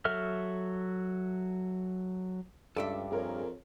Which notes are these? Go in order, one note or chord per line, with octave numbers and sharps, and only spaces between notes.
F#3 F#4 A4 E5 F6
C#2 G2 A4 D5 E5
F2 G#4 A#4 C#5